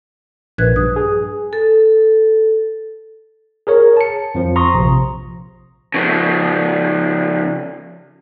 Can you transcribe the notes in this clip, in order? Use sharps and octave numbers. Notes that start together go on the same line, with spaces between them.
A#1 B4 F#6 G#6
G2 D#6
G#4
A4
G#4 A#4 C#5
A5 C#7
F2 F3
A#5 C6 C#6 D#6 A#6
A#1 C3 F3
C#3 F3